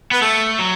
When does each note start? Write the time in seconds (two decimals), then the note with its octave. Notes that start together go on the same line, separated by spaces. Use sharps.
0.11 B3 B4
0.21 A3 A4
0.59 F#3